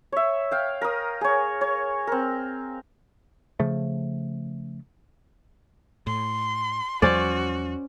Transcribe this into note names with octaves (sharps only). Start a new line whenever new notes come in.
C#5 E5
F5 G5
A#4 D#6
G#4 C#5
C#5
C4 A#4
C#3 F3 A3
A2 C6
E2 F3 G3 C#4 F#4 C5 D5